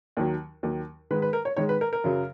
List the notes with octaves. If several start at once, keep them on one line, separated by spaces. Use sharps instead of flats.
D#2 D#3 F#3
D#2 D#3 F#3
G#2 D#3 G#3 B4
B4
A#4
C#5
G#2 D#3 G#3 C#5
B4
A#4
A#4
F#2 C#3 F#3